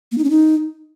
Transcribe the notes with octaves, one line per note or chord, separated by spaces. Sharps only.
A#3
D#4
C#4
D#4